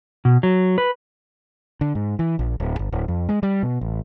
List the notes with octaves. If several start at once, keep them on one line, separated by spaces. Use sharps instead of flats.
B2
F#3
B4
D3
G#2
E3
A#1
D1
G1
D1
F2
G#3
G3
B2
A1